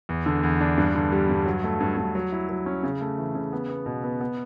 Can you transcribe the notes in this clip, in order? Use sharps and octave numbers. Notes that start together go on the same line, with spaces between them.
E2
D3
E2
D4
G2
D3
G3
G2
F#3
A3
G2
G2
F#3
E4
F#3
C#4
C#3
A3
E3
C#3
B3
B3
B2
B3
B3